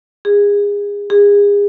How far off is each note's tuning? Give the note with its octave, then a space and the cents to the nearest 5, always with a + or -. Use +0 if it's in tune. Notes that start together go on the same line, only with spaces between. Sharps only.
G#4 -30
G#4 -35